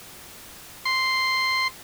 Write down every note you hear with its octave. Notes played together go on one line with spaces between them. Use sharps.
C6